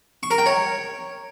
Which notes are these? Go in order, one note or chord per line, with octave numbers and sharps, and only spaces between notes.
C#6
A#4
G5
C#5